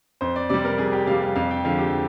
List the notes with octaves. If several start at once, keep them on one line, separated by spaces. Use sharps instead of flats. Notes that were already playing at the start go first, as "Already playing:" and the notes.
F2 C5
D5
C3 G3 D5
A#4
F2 G#4
G4
C3 G3 F5
F5
F2 F5
G5
D3 F3 G#3 F5
G4